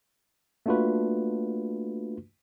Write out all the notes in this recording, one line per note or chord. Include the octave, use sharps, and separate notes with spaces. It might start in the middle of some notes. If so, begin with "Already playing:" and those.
A3 A#3 D4 F4 F#4 B4